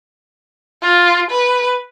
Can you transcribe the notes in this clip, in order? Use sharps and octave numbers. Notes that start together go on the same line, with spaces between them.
F4
B4